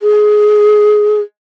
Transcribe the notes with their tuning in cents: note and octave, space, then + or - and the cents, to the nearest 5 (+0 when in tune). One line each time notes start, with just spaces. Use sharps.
G#4 +15